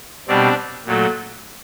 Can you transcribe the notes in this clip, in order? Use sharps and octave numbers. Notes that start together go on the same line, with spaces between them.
B2 G3 C4 D4
A#2 F#3 A3